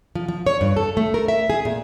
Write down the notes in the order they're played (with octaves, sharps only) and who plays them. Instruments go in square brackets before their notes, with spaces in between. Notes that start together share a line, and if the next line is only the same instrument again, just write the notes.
[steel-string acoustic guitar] F3
F3
C#5
G2
A4
A3
A#4
E5
G#4
A#2